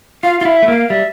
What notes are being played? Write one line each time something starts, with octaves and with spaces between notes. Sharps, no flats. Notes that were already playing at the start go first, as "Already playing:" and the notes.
F4 F5
F4 F5
E4
E5
A3
A#3 F5
G3 E5